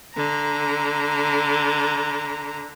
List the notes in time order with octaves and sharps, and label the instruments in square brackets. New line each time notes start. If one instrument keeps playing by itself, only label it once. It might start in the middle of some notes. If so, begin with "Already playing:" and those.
[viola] D3 A#5